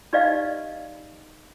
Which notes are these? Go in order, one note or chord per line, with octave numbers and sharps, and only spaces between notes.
D#4 G4 B4 D5 D#5 F5